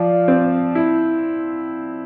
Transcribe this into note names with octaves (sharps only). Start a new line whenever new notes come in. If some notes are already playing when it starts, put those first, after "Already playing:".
Already playing: F3 D5 F5
C4
E4